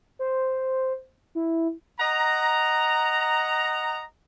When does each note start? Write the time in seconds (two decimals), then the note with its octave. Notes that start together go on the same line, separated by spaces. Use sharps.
0.19 C5
1.35 E4
1.99 D#5 F#5 A#5